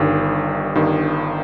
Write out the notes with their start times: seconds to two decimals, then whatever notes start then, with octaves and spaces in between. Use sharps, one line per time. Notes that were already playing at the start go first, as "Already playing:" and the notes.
Already playing: G1 G2 D#3
0.75 G1 G2 D#3